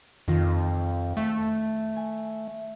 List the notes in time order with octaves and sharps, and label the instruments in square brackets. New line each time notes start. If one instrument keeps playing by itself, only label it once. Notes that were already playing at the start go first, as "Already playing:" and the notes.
[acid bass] F2 [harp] D#3 F4 A#6
[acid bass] A3
[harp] G#5